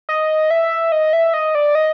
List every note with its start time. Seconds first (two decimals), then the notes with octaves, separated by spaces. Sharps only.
0.09 D#5
0.51 E5
0.92 D#5
1.13 E5
1.34 D#5
1.55 D5
1.75 D#5